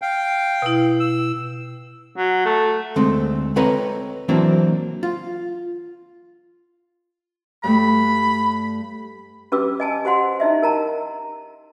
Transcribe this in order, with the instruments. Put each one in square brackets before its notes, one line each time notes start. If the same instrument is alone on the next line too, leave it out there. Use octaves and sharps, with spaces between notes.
[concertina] F5 G5
[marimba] B2 E4
[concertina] E6
[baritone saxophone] F#3
A3
[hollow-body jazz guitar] D2 G#3 A3 C4
C4 A4 B4 C#5 D#5 A#5
E3 F#3 A#3 C4 D4
F4
[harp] G2 G3 A3 [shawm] B5
[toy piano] C#4 G4 B4 D6 E6
D#5 G#5 A5
G4 C5 F#5 C6
D#4 E4 D#5 E5
A#4 A5 A#5